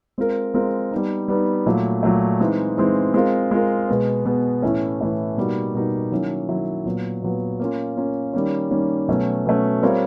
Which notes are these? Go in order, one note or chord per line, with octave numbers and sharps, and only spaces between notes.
G#3 C4 F4 A#4
G#3 C4 F4 A#4
G3 B3 D#4
G3 B3 D#4
A#2 F#3 A3
A#2 F#3 A3
E3 G#3 C4 D#4
E3 G#3 C4 D#4
G#3 C4 F4 A#4
G#3 C4 F4 A#4
B2 G#3 B3
B2 G#3 B3
A2 E3 A3 C#4
A2 E3 A3 C#4
B2 G3 A#3 D#4 F#4
B2 G3 A#3 D#4 F#4
D#3 F#3 A#3 C#4 E4
D#3 F#3 A#3 C#4 E4
A#2 F#3 B3
A#2 F#3 B3
A#3 C#4 F4
A#3 C#4 F4
D#3 G3 A#3 C#4
D#3 G3 A#3 C#4
B2 F#3 A3 C#4
B2 F#3 A3 C#4
G3 C4 F4 A#4 C#5